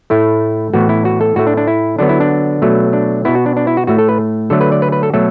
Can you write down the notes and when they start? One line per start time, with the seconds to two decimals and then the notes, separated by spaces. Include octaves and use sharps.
0.10 A2 A3 E4
0.74 A2 E3 B3 F#4
0.89 E4
1.05 F#4
1.21 A4
1.36 A2 A3 F#4
1.47 D4
1.57 D4
1.67 E4
1.99 D3 F#3 B3 D4
2.09 E4
2.20 D4
2.62 B2 F#3 A3
2.93 D4
3.25 B2 B3 E4
3.35 F#4
3.46 D4
3.56 D4
3.67 E4
3.77 F#4
3.87 A2 A3 F#4
3.98 A4
4.09 B4
4.50 D3 F#3 A3 A4
4.61 B4
4.72 D5
4.82 B4
4.92 B4
5.03 A4
5.13 B2 F#3 A3 A4